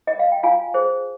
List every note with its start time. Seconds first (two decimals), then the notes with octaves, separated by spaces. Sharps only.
0.07 D#5
0.19 F5
0.32 G5
0.43 F4 F5 G#5
0.74 G#4 C5